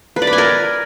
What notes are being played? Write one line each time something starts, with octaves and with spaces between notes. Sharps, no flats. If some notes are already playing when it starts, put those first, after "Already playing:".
B4
D5
B5
G#5
A#4